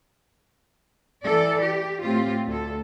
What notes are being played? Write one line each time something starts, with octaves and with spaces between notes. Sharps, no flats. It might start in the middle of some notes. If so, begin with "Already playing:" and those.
E3 A4 D5
G4
A2 C4 F4 G4
D2 A4